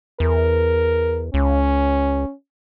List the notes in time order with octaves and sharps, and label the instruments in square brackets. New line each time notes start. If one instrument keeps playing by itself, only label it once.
[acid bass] E2 [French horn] A#4
[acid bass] C#2 [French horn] C#4